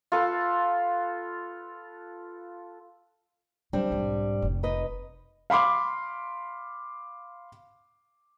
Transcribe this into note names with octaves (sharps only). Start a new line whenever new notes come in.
F4 A4 B4
D3 F#3 G3 C4 D4
B1 G#2
F1 C3
D#4 B4 D#5
F5 B5 C6 D6